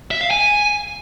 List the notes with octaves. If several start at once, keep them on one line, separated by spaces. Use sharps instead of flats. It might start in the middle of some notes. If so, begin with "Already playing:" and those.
E5
F5
G#5